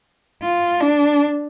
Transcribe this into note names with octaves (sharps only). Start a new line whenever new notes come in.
F4
D4